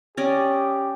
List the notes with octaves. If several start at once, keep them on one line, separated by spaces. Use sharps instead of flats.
C#4 G4 D5 D#5